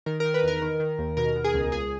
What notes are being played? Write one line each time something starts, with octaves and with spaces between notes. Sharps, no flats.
D#3 A#4
A#4
D#3
B4
E2 A#4
D#3
D#3
D#2
B2 A#4
B2
G#4
C#2
C#2 G#4